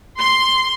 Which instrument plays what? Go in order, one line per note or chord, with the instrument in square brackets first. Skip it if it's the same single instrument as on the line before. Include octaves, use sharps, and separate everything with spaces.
[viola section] C6